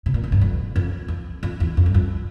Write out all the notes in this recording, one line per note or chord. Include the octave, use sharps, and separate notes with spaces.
C3
A#2
A2
G2
F2
F2
F2
F2
E2
F2
G2
F2